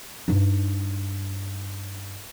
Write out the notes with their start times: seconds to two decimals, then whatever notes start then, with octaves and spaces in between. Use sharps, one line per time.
0.28 G2 D#4